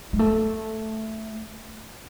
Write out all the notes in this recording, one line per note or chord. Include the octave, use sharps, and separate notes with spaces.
G#3
A3